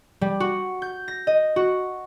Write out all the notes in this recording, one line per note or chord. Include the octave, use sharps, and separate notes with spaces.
G3
F#4
G6
A#6
D#5
F#4